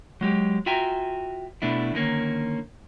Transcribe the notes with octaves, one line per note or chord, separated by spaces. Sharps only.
F#3 G#3 G4
F4 F#4 E5 G5 G#5 A#5
B2 A3 D4 E4
D3 D#3 A#3 C#4